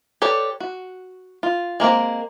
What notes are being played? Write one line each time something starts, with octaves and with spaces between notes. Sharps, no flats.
G4 A4 B4 C#5 D5
F#4
F4
G#3 A#3 C4 A#4